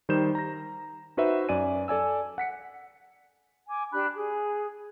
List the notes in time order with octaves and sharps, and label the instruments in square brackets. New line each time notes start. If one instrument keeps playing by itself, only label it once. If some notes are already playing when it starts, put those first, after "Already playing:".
[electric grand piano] D#3 G3 D#4 C5 G6 E7
A#5 A#6
D#4 F#4 B4 C5 E5
F#2 D5 G#5 D#7
A4 D5 G#5 E6
F#5 B6 C#7
[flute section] G#5 D6
D4 G4 B5 F#6
G#4